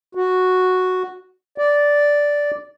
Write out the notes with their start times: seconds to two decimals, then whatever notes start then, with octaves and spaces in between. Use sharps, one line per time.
0.15 F#4
1.58 D5